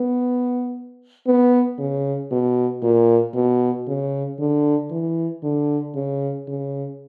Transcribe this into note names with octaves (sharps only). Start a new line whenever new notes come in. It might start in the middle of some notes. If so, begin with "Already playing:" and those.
Already playing: B3
B3
C#3
B2
A#2
B2
C#3
D3
E3
D3
C#3
C#3